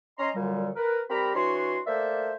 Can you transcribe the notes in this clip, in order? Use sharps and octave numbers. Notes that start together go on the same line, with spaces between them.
C#4 D#5 A#5 C6
F#2 A#2 D3 F#3 G3
A#4 B4
G3 C4 G4 A#4 A#5 B5
E3 D4 F#4 C#5 C6
A3 A#3 C5 D5 E5